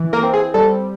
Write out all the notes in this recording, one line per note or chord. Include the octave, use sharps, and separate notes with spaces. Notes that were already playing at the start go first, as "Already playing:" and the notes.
Already playing: E3
A#3 A#4
C4
G#4
G3 A4